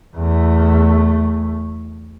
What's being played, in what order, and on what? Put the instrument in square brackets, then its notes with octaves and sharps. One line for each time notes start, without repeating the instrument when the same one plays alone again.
[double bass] E2 A3